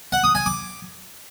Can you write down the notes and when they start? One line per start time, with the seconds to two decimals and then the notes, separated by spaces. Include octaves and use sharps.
0.12 F#5
0.24 D#6
0.35 G#5
0.46 D6